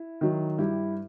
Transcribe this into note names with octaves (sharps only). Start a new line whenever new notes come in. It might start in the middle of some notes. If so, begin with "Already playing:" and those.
Already playing: E4
D#3 F#3
G2 E4 G4